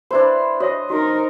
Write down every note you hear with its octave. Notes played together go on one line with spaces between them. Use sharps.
D4 E4 B4 C5
F#4 C#5 D#5 E5
D#4 F#4 A#4